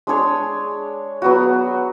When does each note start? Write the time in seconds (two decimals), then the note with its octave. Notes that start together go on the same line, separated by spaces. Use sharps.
0.07 G#3 D4 G#4 C#5
1.22 F#3 B3 F#4